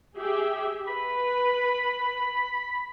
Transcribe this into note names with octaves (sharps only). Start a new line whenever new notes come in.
G4 G#4 E5
B4 B5